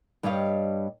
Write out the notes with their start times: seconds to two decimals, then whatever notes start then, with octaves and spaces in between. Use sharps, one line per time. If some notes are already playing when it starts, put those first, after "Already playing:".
0.23 G2 G3 G4 C#5 D#5 F5